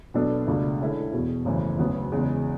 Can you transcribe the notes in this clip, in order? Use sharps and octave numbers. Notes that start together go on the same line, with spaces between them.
B2 F#3 B3 D4 A4
C#2 B2 A3 D4
D3 G#3 C#4 E4 A4
E1 E2 B2
G#1 F#2 C#3 E3 A3
E1 D2 C#3 F#3 B3
E2 C#3 G#3